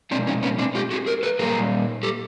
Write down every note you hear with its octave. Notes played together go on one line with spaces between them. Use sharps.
B2 G#3 C4 D4
C#4 D#4
B3 C#4
C4 D4
F4 G4
F#4 G#4
G#4 A#4
A4 B4
A#2 G3 A#3 G#4 A#4
G4 A4